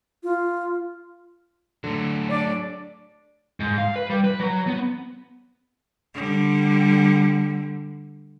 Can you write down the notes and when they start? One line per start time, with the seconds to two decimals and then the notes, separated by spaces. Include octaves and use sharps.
0.23 F4
1.84 D3 F#3 A3
2.29 D4 C#5 D5
3.60 G#2
3.78 F5
3.96 B4
4.10 G3
4.24 B4
4.40 F#3
4.67 B3
6.15 D3 G3